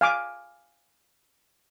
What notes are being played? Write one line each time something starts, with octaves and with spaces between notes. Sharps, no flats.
F5 G#5 D6